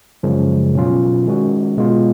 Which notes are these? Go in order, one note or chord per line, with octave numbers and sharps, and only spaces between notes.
F#2 C#3 F3 G#3 C#4
B2 F#3 C#4 F4
D#3 G#3 C#4 F#4
B2 G#3 B3 F4